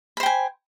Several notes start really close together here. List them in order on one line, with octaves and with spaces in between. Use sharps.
B5 C5 G5 G#5